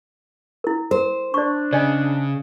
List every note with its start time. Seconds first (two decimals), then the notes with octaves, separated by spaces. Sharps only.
0.64 E4 A#4
0.91 A#4 C5
1.34 D4 D5 C#6
1.73 C#3 D5 D#5 G#5